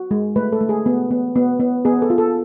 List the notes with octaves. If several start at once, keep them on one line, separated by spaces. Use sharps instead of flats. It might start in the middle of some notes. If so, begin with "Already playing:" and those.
Already playing: F#4
G#3
A3 B4
A4
A3
G#4
B3
B3
B3
B3
B3 G#4
A4
F4
A4